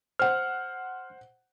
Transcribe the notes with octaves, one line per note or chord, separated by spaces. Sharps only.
C5 F#5 F6